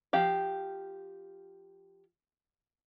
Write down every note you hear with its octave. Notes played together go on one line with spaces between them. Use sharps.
F3 G4 F5